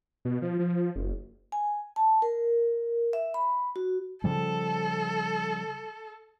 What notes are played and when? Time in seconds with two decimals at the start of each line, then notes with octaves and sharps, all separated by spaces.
0.25 B2
0.42 F3
0.59 F3
0.96 F#1
1.52 G#5
1.96 A5
2.22 A#4
3.13 E5
3.34 B5
3.76 F#4
4.24 C#3 F3 G3 A4